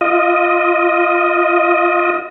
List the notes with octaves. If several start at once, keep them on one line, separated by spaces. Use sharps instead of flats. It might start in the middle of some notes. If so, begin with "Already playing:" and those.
F4 D#5